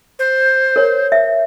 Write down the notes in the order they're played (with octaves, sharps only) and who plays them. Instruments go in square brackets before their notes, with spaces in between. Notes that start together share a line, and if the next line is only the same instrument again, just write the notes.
[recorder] C5
[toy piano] A#4 C#5
E5